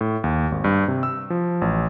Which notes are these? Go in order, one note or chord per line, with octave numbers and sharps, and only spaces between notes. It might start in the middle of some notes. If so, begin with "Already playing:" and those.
A2
D#2
G#1
G2
C3
E6
F3
A1